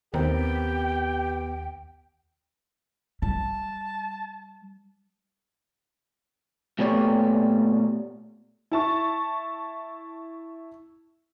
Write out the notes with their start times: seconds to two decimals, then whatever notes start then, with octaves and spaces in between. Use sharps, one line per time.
0.14 D#2 B3 C4 G4 A#4 G5
3.22 G3 A5
6.79 A#2 A3 B3 G4 C#5 D5
8.72 E4 A5 C#6